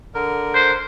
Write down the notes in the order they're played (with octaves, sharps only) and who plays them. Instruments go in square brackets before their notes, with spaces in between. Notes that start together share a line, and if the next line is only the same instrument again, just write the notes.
[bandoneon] D3 A#4
[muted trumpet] C5